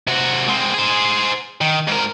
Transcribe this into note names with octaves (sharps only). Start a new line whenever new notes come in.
C3 F#4
G#3 C4
G#4 C5
D#3
G#2 A#4